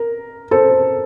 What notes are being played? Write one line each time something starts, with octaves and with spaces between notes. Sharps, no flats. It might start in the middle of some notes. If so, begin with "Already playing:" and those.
Already playing: A#4
A4 C5